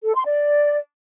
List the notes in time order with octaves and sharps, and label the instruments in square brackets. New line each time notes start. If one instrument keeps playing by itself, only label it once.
[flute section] A4
C6
D5